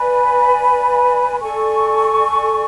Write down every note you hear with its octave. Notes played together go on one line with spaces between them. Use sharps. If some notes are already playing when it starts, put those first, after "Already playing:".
Already playing: B4 D5 G#5 B5
A4 D5 G#5 C#6